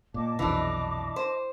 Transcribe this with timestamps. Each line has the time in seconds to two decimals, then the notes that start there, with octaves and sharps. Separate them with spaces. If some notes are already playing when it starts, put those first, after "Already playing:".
0.14 A#2 D#5 A5 D6
0.39 B1 F2 C3 E3 D4
1.16 C5